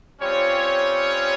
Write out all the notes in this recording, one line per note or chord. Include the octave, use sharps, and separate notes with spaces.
G3 C4 C#4 F4 C#5